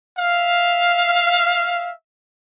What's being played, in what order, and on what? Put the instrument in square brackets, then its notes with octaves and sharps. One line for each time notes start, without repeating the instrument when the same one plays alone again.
[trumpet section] E5 F5